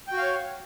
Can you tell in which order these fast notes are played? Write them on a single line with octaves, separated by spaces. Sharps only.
G5 F#4 F5 C#5